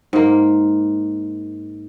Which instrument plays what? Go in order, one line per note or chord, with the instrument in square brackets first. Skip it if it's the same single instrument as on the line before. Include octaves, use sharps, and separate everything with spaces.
[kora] G#2 A#3